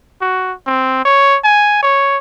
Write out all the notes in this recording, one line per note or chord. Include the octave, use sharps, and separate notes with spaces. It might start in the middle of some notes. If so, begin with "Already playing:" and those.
F#4
C4
C#5
G#5
C#5